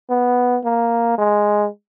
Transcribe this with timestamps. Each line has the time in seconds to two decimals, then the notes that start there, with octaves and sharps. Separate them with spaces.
0.10 B3
0.64 A#3
1.18 G#3